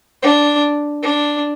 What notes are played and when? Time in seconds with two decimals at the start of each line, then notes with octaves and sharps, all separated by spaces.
0.23 D4
1.03 D4